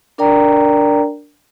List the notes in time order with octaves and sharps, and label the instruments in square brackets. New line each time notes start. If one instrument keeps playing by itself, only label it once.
[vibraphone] D4 A#4 D5 G5 A#5